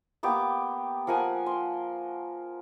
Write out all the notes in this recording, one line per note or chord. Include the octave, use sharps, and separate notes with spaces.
A#3 B3 G4
F3 A#4 F#5 G#5
C6